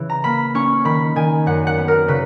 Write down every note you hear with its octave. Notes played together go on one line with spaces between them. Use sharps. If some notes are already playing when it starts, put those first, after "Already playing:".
Already playing: C#3 E3
A#5
A#3 B5
C#4 C#6
D#3 B5
D#3 G#5
F#2 F#5
F#5
B3
A#4
C#3 B4